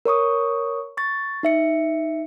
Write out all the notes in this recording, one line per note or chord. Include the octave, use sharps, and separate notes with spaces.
A#4 C#5 C#6 D#6
C#6 A6
D#4 E5 C#7